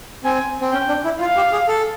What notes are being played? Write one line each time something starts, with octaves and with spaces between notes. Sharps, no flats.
C4 G#5
C4
C#4 G5
D4
E4
F4 F5
G4
G#4
A4